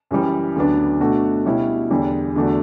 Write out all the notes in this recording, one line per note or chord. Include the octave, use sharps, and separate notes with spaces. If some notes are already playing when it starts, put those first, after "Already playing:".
F#2 C#3 E3 G3
D2 C#3 F#3 B3 D4
B2 A3 D4 F#4
B2 G3 C#4 E4
E2 D3 G3
E2 D3 A3 D4 F#4